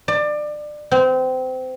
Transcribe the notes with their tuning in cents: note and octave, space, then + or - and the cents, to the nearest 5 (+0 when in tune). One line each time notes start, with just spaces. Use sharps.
D5 +25
C4 -25